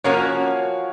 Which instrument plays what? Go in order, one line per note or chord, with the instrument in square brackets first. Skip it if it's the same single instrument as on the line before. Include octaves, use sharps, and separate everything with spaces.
[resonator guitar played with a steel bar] F3 A#3 C#4 F#4 [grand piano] A#4 C#5